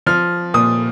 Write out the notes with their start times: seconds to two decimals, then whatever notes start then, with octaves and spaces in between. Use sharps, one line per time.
0.07 F3 F6
0.54 A#2 D#6